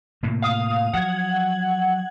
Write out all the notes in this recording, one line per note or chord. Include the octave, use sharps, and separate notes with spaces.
A2 C3 A#3
F5 D#6
F3 F#3 F#5 G#6